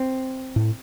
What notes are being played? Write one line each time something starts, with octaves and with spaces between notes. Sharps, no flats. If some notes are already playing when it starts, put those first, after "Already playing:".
Already playing: C4
A2